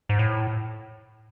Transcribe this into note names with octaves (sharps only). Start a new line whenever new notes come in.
G#2
A2